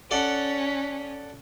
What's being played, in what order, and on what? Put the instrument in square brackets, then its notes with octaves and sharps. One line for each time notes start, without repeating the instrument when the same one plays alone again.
[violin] C#4 [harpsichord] A4 D5 F#5